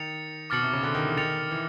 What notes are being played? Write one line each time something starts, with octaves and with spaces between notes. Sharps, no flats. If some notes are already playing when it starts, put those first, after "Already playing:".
Already playing: D#3 A6 C#7 F7
B2 D6 F6 A6 C#7 F#7
C3
C#3
D3
D#3
E3
D#3 A6 C#7 F7
E3